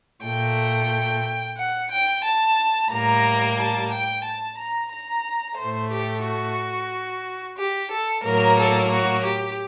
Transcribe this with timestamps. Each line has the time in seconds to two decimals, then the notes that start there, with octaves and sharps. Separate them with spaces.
0.24 A#2 A3 G5
1.58 F#5
1.91 G5
2.24 A5
2.91 A2 G3 A#3 A#5
3.58 A5
3.91 G5
4.24 A5
4.59 A#5
4.91 A#5
5.58 A2 A3 C5
5.91 G4
6.25 F#4
7.58 G4
7.91 A4
8.25 A2 F#3 A#3 A#4
8.58 A4
8.92 F#4
9.25 G4